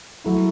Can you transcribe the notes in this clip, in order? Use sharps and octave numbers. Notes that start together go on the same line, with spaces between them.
F#3 A3 E4